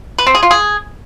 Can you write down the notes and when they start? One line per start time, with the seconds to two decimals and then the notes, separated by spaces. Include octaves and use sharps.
0.18 B4
0.27 C4
0.35 G#4
0.43 F4
0.51 G#4